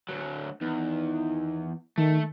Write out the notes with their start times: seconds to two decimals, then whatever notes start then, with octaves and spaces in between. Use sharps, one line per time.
0.09 D2 F#3
0.61 E2 D#3
1.98 D#3 A3